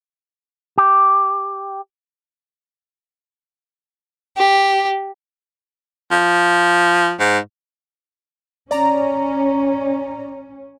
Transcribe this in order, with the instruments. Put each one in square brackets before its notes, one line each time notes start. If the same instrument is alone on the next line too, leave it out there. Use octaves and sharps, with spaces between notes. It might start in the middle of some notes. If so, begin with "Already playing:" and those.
[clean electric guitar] G4
[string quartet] G4
[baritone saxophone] F3
G#2
[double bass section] C#4 [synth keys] D5 A#5